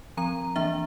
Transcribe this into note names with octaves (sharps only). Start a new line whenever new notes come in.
F3 C4 A#5
E3 A#3 D4 E5